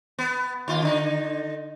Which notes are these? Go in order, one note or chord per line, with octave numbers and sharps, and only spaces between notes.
B3
D#2 F4
D3 D#4